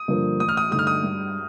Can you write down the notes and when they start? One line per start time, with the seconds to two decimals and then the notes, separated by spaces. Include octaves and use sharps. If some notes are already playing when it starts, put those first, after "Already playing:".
Already playing: D#6
0.08 G2 D3 F3 A#3
0.40 A1 D#6
0.49 F6
0.57 D#6
0.71 G2 D3 A3 D#4 D#6
0.79 F6
0.87 D#6
1.04 G2